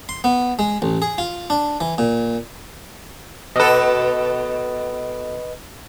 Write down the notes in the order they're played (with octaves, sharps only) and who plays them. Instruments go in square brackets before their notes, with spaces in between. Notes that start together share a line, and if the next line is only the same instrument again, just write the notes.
[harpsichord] C6
B3
G#3
A1
G#4
F4
D4
E3
A#2
[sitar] B2 A4 [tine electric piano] B4 D#5